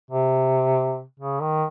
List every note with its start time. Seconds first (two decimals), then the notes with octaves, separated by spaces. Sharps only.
0.11 C3
1.20 C#3
1.42 D#3